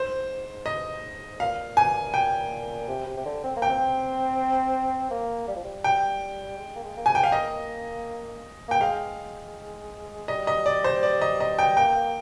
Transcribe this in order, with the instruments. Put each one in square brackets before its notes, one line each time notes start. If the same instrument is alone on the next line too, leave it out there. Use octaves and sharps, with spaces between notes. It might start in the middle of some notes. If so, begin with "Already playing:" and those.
Already playing: [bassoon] G#2 [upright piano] C5
[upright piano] D#5
[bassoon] A#2 [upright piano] F5
[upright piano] G#5
G5
[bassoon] C3
C3
C3
D3
C4
A#3
[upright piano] G5
[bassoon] C4
A#3
G3
F3
G3
[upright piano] G5
[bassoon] G#3
A#3
G#3
A#3
[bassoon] G#3 [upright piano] G#5
[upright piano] G5
F5
[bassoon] A#3 [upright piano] D#5
[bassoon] A#3 [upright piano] G5
[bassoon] G#3 [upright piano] F5
[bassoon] G3 [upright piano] D#5
[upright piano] D#5
D5
C5
D5
D#5
D#5
G5
[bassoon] A#3 [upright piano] G5
[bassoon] A#3